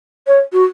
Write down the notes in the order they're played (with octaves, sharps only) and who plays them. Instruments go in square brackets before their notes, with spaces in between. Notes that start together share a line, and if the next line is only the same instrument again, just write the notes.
[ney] C#5
F#4